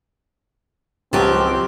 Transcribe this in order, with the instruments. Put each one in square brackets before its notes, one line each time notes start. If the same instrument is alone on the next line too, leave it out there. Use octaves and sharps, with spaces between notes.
[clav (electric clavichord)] C#2 F#3 [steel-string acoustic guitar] F3 G4 [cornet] C4